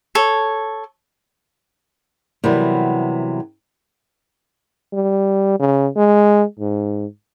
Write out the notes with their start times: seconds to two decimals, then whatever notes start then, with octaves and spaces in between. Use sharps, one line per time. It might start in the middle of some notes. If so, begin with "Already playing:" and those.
0.15 A4 C#5
2.44 C3 E3 F#3 G3 B3 A#4
4.93 G3
5.59 C#3
5.96 G#3
6.59 G#2